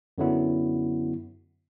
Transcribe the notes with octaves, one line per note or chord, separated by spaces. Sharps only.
F#2 D3 F#3 B3 E4